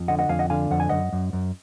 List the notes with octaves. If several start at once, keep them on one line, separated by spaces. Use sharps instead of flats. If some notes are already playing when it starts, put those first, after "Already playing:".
Already playing: F2
D3 D#5 F#5
D#5 F#5
F2 F5 G#5
D#5 F#5
D3 F5 G#5
F2 F#5
G#5
F#2 D#5 F#5
F#2
F#2